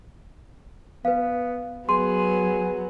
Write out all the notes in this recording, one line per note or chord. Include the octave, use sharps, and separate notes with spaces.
B3 B4 F5
F#3 B3 G#4 C6